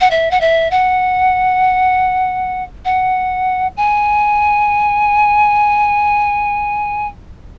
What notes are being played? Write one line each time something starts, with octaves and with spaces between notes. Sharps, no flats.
F#5
E5
F#5
E5
F#5
F#5
G#5